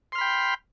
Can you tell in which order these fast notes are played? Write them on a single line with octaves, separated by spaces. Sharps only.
C6 F6 B5 G5